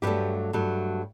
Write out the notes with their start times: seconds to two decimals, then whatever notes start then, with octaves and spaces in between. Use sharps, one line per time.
0.02 G2 F#3 A3 G4 B4
0.53 G2 F#3 A3